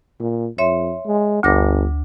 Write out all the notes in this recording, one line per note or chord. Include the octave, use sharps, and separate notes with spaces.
A#2
F2 C#5 E5 C6
G#3
G1 D2 D6 A#6